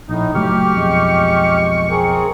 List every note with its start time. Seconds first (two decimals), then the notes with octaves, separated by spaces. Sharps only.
0.09 A#1 A2 D#4
0.35 F#1 F#3 A3 G4 C#6 F6
0.75 B1 F2 G#3
1.90 C4 G#4 A#4